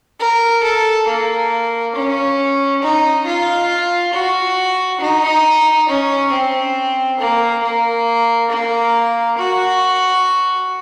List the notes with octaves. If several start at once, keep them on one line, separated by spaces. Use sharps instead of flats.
A#4
A4
A#3
C#4
D#4
F4
F#4
D#4
C#4
C4
A#3
A#3
A#3
F#4